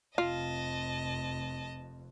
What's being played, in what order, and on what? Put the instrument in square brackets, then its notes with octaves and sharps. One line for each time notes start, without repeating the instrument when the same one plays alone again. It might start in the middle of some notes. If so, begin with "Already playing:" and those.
[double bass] F1 F2 [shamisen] F4 [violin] D#5 A5